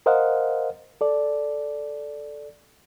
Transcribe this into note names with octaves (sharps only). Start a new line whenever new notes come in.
A#4 C5 D#5 F5 F#5
A4 D5